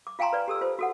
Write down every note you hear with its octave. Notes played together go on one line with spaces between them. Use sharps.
D6
F4 F5 G5 G#5 A#5 C6
B4 D5
G4 A4 E6
F4 C5
F#4 A4 F#5